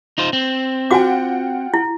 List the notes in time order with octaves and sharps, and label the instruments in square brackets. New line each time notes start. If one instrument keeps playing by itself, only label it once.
[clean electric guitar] D#4 F4 C5
C4
[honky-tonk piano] F4 F#5 G5 [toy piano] F#4 D6
[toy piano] E4